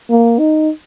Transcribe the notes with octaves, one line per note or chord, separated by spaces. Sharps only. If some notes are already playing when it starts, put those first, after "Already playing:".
A#3
D#4